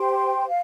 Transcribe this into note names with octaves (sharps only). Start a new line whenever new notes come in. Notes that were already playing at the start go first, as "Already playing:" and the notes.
Already playing: G4 C5 G5 C6
F5